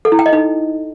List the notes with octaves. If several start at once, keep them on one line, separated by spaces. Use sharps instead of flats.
A4
E4
G5
D#5
D#4